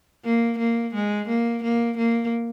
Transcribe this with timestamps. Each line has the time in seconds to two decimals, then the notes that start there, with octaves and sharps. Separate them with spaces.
0.24 A#3
0.59 A#3
0.94 G#3
1.28 A#3
1.63 A#3
1.98 A#3